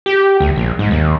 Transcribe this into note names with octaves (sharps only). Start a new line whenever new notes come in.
G4
D2
A#1
G#2
D#2